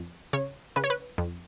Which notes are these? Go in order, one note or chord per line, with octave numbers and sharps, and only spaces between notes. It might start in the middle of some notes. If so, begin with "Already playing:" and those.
Already playing: F2
C#3 C#5
C#3 B4
C#5
B4
F2